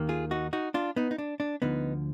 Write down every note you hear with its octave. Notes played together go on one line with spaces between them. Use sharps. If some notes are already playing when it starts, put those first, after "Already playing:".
Already playing: D#2 D#3 A#3
F4 G#4
D#4 F#4
D#4 F#4
D4 F4
B3 D#4
D#4
D4
D4
D2 D3 F3 B3 D#4